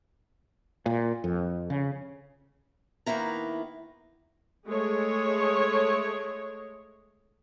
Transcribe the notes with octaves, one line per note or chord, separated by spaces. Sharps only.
A#2
F2
C#3
D#3 A#3 B3 E4 A#5
G#3 A3 C#5